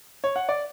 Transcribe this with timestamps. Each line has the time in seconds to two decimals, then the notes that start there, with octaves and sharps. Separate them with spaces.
0.24 C#5
0.36 F#5
0.49 D5